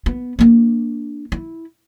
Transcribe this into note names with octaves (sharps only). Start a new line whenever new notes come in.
B3
A#3 D4
E4